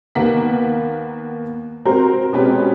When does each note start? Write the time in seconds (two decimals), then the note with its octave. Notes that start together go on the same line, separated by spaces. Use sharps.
0.15 D#2 A#3 B3 A#4 F#5 B6
1.85 C4 F#4 A#4 C5 A#5
2.33 B2 G#3 C4 C#4 G4 B4